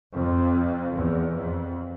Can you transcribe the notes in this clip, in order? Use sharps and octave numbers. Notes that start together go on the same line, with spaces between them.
F2
E2
F2